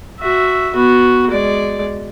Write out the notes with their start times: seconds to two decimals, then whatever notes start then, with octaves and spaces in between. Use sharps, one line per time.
0.20 F#4 E5
0.74 B3 F#4
1.30 G#3 D5